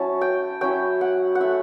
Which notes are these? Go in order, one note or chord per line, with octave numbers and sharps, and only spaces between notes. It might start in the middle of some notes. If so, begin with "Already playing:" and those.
Already playing: F#3 C#4 E4 A5
G5
F#3 C#4 E4 G5
F#5
F#5
A3 E4 E5